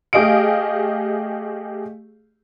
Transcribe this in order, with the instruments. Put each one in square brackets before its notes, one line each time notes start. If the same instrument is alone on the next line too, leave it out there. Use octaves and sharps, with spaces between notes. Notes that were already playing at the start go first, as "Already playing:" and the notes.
[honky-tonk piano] A3 G4 G#4 D#5 F5 D7